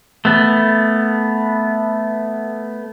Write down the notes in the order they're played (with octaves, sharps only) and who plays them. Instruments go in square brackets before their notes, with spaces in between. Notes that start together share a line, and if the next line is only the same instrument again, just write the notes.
[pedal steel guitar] A3 B3